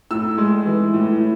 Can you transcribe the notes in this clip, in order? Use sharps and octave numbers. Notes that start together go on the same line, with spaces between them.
A2 E6
G#3
E3
A2
A2